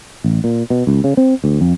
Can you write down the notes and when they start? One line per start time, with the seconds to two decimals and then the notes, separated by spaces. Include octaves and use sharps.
0.24 A1
0.44 A#2
0.70 B2
0.87 C#2
1.04 C#3
1.17 C4
1.44 D2
1.61 F2